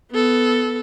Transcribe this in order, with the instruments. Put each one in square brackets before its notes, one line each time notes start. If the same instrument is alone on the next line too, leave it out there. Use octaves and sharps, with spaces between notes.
[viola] B3 A4